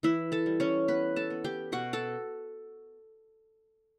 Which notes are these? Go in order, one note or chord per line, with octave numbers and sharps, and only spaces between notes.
E3 E4 E5
A4 A5
G3
C#4 C#5
B3 B4 B5
A4 A5
B3
G4 G5
B2 F#4 F#5
A4 A5